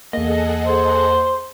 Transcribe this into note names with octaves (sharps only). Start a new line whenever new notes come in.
E2 A#3 G#4 A4 D#5 F#5
C5